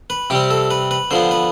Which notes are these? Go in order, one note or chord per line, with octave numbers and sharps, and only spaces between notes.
B4
C3 G3 C4 G4
A4
B4
B4
D3 F3 B3 C5
B4